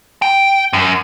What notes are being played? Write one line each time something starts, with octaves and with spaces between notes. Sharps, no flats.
G5
F#2